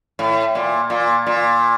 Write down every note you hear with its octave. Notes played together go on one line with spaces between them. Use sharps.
A2
A#2
A#2
A#2